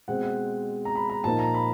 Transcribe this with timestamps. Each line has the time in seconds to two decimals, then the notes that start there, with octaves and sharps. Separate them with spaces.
0.08 B2 G#3 C4 F#5
0.23 F#5
0.85 A#5
0.95 B5
1.10 A#5
1.24 A#2 F3 A#3 D#4 A5
1.39 A#5
1.54 B5